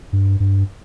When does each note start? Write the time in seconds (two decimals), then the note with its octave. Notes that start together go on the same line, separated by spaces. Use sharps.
0.13 G2
0.40 G2